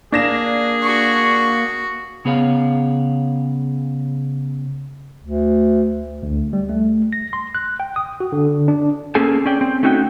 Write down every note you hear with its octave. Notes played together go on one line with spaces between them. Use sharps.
A#3 D4 G#4 A#6 E7
F#4 C#6
C#3 B3 G#4 C#5 F5
D2
D2
G3
A3
A#6
C6
F#6
G5
D#6
F#4
D3
D4
A#3 C4 C#4 G#4 A4 G#5
C#4 D5 G5
C4
A3 C#4 D#4 F#4 F5 G5